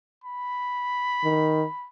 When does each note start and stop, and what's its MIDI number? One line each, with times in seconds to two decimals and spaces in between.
0.24 1.87 83
1.24 1.64 51